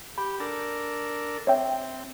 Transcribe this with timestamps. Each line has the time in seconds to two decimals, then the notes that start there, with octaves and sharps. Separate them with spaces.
0.18 G4 B5
0.40 D4 A4 A#4
1.47 C4 C#5 E5 G5